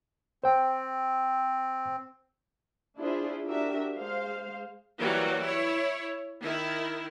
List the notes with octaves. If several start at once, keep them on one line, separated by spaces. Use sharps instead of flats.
C4 C5 G5
D4 E4 F4 G#4 C5 E5
D4 F#4 G4 A#4 E5
G#3 C5 F5
E3 F#3 G3 A#3 F#4
E4 C#5
D#3 E4